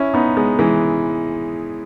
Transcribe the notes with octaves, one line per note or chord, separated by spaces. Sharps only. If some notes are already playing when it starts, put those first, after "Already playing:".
Already playing: C#4 E4
B3 D#4
G#3 B3
E3 G#3